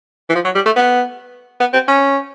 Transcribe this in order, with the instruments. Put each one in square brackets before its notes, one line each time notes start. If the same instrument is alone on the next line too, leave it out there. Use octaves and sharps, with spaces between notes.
[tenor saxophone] E3
F3
F#3
G3
A3
B3
B3
C4
C#4